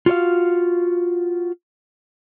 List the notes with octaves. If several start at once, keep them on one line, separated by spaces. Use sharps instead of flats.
F4 F#4 C#5 F5